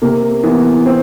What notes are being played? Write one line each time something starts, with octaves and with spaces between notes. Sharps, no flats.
C3 A#3
E3 B3
C4